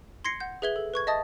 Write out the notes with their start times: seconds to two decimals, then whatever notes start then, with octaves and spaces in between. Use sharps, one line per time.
0.25 C6 G#6 A#6 C7 C#7
0.40 F#5 G6
0.62 G#4 B4 E5 G#6 G7
0.76 A4
0.94 B4 C#6 G#6
1.07 D#5 E5 A5 D#6 A6